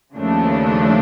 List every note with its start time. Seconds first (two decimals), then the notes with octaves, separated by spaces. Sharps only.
0.16 D#2 C#3 F3 A3 D4